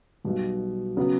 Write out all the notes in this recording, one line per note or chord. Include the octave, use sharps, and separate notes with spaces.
B1 B2 G3
C#3 F#3 B3